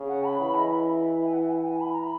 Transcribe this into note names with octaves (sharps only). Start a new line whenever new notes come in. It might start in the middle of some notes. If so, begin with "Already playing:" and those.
Already playing: C#3
F#5
B5
E3 B5
D#5
E5
G#5
F#5
G#5
F#5
G#5
B5
A#5
B5